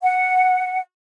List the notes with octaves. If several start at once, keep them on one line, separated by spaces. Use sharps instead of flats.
F#5